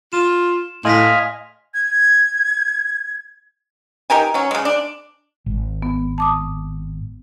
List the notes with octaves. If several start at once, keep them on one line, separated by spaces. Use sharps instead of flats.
F4 E7
A2 D#5 F5 G#5 C6 A#6 B6
G#6
D#4 G4 A#4 G#5
F#3 C#4
C#3 G#3
D4
G#1
B3
A5 D6 D#6